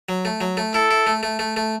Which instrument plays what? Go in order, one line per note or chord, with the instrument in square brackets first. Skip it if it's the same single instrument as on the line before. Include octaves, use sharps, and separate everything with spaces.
[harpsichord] F#3
A3
F#3
A3
[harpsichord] E4 [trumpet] A4
[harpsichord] E4
A3
A3
A3
A3